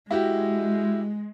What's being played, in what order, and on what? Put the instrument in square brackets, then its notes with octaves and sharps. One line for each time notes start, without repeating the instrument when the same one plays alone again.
[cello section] G#3 [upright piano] E4 F#4 G4